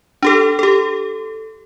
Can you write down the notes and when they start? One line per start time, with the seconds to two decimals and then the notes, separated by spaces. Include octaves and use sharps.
0.23 D4 G4 A4
0.59 G4 A4